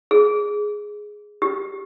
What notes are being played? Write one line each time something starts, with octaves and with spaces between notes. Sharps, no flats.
G#4
G4